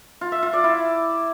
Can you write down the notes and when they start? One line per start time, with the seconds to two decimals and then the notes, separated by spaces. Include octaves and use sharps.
0.21 F4
0.32 E5
0.43 F4
0.53 D5
0.64 E4